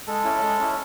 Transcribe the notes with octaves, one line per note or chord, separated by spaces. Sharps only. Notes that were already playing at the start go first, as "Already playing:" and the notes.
G#3 A4
C#4 E4
G#3
C#4 E4